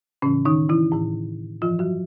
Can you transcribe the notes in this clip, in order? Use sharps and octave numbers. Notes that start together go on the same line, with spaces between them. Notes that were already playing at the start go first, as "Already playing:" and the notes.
A2 C#3 E3 C#4
D#3 D#4
E3 E4
A2 E3
G2 E3 F3 F4
F#3 F#4